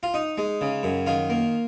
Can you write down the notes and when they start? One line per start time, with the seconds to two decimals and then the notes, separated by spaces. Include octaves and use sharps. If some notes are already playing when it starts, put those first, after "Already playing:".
0.03 F4
0.14 D#4
0.38 G#3
0.61 C#3
0.83 F#2
1.07 D#3 F4
1.30 A#3